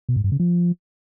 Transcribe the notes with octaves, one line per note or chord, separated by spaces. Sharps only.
B2
G#2
G2
C#3
F3